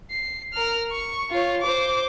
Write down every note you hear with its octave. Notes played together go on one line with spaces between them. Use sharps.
C7
A#4 F6
C#6
F4 C#5
C5 D6